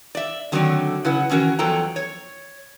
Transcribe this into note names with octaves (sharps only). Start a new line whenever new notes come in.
D5 E5
D3 D#3 F#3 A3 C4 D5
C#3 E4 B4 F#5
D#3 E3 C#4 F#4 A#4
E2 F3 F#3 A4 G5 A#5
C#5